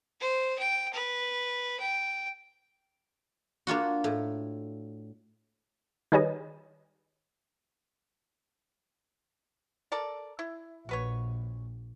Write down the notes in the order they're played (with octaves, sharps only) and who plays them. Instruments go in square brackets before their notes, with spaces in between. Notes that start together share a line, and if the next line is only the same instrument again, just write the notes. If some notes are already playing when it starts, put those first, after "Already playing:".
[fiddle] C5
G5
B4
G5
[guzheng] A#3 D4 F4 F#4
A2
[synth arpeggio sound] D#3 G3 G#4 B4 C#5 D#5
[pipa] A4 A#4 D5
E4
[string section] A#1 [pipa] F#4 B4 C#5